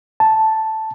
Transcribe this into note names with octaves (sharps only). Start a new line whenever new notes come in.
A5